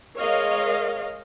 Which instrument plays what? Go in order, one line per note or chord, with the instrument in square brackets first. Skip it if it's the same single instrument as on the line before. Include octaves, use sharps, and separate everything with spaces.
[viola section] G#3 A#4 C#5 D#5 F5